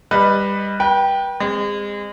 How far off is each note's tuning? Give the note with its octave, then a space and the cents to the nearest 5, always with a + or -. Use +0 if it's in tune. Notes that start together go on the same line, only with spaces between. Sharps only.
G3 +20 B4 +0 D#5 +0
B4 -35 G5 +0
G#3 -30 C4 +0